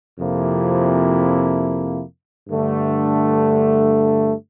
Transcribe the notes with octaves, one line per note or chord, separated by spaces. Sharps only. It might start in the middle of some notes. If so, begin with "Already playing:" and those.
F2 C3 F3 A#3 E4
G2 D3 A3